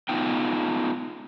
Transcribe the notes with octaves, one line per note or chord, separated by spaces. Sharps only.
B3 D#4 F4 G5